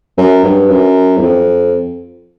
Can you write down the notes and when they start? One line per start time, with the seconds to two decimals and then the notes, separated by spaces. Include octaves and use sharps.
0.18 F#2
0.44 G2
0.70 F#2
1.17 E2
1.22 F2